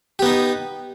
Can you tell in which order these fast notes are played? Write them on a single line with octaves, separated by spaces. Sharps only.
G4 B3 D#4